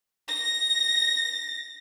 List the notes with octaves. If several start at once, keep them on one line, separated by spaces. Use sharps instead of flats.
A#6